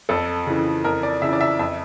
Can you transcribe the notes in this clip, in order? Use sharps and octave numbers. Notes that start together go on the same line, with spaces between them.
F2 A4
C#3 E3
F2 A#4
D5
C#3 E3 E5
D5
E5
F2 E5